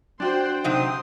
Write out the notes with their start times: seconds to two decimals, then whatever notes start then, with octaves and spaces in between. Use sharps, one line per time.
0.20 D4 F4 F#4 C5 G5 C6 F#6
0.64 C3 F#3 D#4 C6 D#6